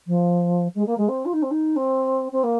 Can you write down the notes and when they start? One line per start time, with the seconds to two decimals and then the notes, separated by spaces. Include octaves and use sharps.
0.07 F3
0.74 G#3
0.86 A#3
0.97 G#3
1.08 C4
1.25 F4
1.33 D#4
1.42 C4
1.51 D#4
1.76 C4
2.32 C4
2.43 A#3